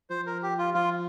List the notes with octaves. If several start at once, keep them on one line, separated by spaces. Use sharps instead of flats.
F3 C5
A#4
G4
F4
F3 F4